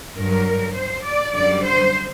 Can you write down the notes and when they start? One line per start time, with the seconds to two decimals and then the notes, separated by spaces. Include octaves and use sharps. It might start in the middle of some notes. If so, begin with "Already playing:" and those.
0.15 G2 F#3 A#4
0.74 C5
1.05 D5
1.34 F#2 D3 G3 D5
1.63 C5